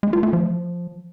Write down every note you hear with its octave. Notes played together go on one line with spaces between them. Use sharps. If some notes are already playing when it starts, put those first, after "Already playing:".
G#3
F4
A3
F3